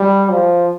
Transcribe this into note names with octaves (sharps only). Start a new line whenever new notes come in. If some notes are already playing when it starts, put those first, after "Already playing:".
Already playing: G3
F3